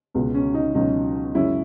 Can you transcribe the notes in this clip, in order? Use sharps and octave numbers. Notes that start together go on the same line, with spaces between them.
C#2 B2 G#3 B3
C#4
D#4
C#2 B2 F#3 C#4 D#4
F#2 C#3 G#3 C#4 E4